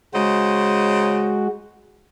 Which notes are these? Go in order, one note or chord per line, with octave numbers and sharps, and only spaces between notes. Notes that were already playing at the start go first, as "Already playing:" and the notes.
C#3 G#3 F#4 C5 D#5